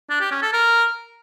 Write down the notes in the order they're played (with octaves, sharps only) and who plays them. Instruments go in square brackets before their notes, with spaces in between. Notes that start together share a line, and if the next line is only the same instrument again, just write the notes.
[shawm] D4
G4
C#4
A4
A#4